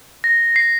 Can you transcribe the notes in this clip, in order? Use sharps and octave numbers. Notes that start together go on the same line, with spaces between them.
A#6
C7